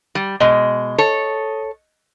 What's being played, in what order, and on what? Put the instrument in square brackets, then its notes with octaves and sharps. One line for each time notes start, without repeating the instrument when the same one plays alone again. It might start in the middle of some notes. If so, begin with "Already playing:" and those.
[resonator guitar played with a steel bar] G3
[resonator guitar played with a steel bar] B2 G#3 [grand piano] D#5 G7
[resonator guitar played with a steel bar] A4 C#5